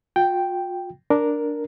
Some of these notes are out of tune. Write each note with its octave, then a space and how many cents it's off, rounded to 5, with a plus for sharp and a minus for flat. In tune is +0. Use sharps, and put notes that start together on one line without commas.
F4 +40 G5 +0
D4 +0 A#4 +0